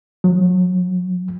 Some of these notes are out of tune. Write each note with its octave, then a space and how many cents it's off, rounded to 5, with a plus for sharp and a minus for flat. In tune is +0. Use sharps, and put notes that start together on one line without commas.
F#3 -30